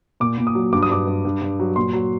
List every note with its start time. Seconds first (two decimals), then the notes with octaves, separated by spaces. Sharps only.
0.20 A#2 D6
0.38 A#2
0.47 D#6
0.55 F#3
0.73 G2 D6
0.83 D#6
0.90 G2 D6
1.07 G2
1.25 G2
1.42 G2
1.60 F#3
1.76 A#2 C6
1.93 F#3